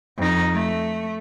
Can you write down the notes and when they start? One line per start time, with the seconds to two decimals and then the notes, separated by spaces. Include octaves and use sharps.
0.18 F2 D#4
0.53 A3